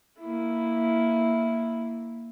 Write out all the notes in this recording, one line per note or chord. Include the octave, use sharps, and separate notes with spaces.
A#3 E4